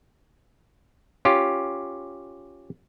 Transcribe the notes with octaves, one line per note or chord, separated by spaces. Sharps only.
C#4 F4 G4